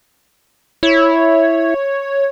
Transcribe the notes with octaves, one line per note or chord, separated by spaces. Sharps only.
E4 C#5